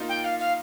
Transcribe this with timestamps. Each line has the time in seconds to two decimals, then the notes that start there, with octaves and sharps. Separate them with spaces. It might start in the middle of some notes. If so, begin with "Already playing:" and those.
Already playing: A#3 D#4 F4
0.09 G5
0.24 F5
0.39 F5